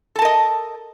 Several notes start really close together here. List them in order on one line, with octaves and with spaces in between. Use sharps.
A4 A5 A#4 D#5